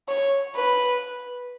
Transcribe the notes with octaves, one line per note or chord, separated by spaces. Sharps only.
C#5
B4